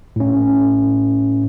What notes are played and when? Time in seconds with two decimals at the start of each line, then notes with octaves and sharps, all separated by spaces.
0.16 A2 C#4